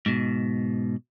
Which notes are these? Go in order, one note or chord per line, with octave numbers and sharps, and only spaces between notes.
G#2 B2